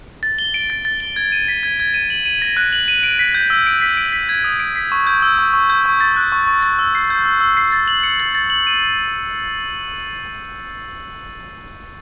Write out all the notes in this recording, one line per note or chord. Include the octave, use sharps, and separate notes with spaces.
A6
G7
D7
A6
A6
G7
G#6
D#7
B6
G#6
G#6
D#7
F#7
D#7
A#6
F#6
F#7
D#7
D7
B6
G6
E6
D7
B6
D7
B6
G#6
D#6
D7
B6
C#6
G6
E6
C#6
C#6
G6
C#6
A6
F#6
C#6
C#6
A6
E6
C7
G6
E6
E6
C7
A6
F#7
C#7
A6
A6
F#7
D#7